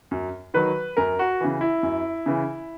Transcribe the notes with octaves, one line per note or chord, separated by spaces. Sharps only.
F#2
D#3 F#3 B4
F#2 A#4
F#4
C#3 E3
E4
F#2
C#3 E3